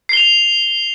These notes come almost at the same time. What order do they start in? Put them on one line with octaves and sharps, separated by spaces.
C7 G7 F7